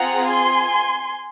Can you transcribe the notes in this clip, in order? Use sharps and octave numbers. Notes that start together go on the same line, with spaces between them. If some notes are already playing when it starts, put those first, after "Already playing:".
Already playing: C4 F4 G#4 F#5 A#5
G#5 C6